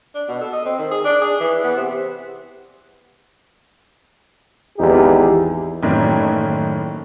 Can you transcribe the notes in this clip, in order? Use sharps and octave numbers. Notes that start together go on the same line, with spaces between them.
D4
B2
A4
D#5
C4
D#3
G#4
D4
G#4
E3
B3
C3
G#1 E2 D#4 G4
F#1 A2 D#3 E3 D5